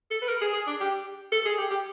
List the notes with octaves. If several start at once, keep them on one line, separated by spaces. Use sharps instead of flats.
A4
B4
A#4
G#4
G#4
D4
G4
A4
G#4
G4
G4